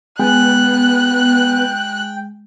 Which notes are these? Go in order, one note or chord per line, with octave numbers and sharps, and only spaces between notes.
G#3 B3 G5 F#6